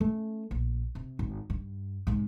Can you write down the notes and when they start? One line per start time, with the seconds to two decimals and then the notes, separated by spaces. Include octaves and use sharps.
0.01 A3 C#4
0.51 A#1
0.95 C3
1.19 G#1
1.50 G2
2.07 G#2 C3